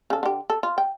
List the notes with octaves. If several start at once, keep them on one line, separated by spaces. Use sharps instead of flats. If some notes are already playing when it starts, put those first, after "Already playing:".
C#3 A4
D3 G4
A4
F4
G5